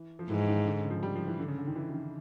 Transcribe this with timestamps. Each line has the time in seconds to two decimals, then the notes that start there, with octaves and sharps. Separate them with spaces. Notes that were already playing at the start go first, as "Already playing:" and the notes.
Already playing: E3
0.19 F3
0.30 G#2 E3
0.48 D#3
0.66 D3
0.79 C#3
0.90 F3
1.03 G3
1.16 F3
1.27 E3
1.39 D3
1.48 C#3
1.58 D3
1.67 D#3
1.76 E3
1.89 E3
1.94 D#3